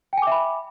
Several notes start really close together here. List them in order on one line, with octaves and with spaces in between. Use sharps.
G5 G#5 D6 E5 B5